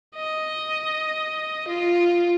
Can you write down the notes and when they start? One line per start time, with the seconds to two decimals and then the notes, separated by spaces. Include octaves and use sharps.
0.16 D#5
1.68 F4